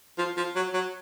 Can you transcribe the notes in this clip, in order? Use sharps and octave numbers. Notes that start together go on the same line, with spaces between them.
F3
F3
F#3
F#3